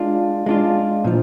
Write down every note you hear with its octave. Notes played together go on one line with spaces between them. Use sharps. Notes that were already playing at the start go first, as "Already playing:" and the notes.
Already playing: G#3 D4 F4
G#3 D4 F4
A#2 F3